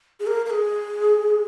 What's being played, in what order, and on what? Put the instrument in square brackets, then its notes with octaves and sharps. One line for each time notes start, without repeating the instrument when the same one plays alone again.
[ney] G#4
A#4
A#4
G#4